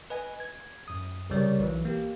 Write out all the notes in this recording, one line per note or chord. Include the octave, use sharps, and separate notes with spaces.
B4 D#5 G#5
G#6
F#2 D#6
C2 C#3 G3 A#4 C#5 D5
B1 E3
A#3 G4